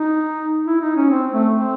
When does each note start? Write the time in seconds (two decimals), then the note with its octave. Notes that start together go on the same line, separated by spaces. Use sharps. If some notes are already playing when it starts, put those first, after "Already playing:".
Already playing: D#4
0.67 E4
0.81 D#4
0.96 C#4
1.10 C4
1.32 A3
1.53 C4